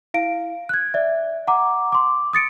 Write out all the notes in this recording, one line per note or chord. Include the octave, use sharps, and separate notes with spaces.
E4 F5 D7
F#6 G#6
D5 E5
F#5 A#5 D6
C6 D6
D#6 A6 C#7 D7